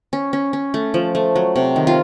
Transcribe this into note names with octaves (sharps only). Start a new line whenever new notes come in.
C#4
C#4
C#4
A3
F3
A3
F#3
C3
D#3
F4